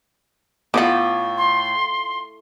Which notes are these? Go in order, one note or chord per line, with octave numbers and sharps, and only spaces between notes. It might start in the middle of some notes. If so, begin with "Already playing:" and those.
A2 B3 F4 B4 F#5 D6
C6